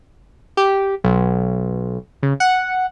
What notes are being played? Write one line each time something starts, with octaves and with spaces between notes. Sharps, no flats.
G4
B1
C#3
F#5